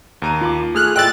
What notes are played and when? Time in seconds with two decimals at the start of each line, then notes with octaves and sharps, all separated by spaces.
0.22 D#2 A#5 D#7
0.41 F4 B5 D6
0.75 A3 G#4 F6 F#6
0.96 A2 F4 D5 D#5 G5 E6 F#6 A6